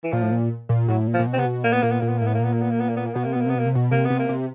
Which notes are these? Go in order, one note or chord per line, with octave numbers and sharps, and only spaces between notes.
E3
A#2 F3
A2
A#2
A#2
A2 F#3
A#2
F3
A#2
B2
C4
C3 B3
B2
A#2 A#3
B3
A#2 A#3
B3
A#2 A#3
B3
A2 A#3
B3
A#3
A#2 B3
A#3
B3
A#3
B3
A#3
B3
A#3
B2 B3
C3 A#3
B2 B3
A#3
C3 B3
B2 A#3
C3
B2
C3 A#3
C3 B3
A#3
C3